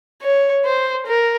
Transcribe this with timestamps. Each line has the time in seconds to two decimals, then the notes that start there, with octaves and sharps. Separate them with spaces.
0.22 C#5
0.65 C5
1.07 A#4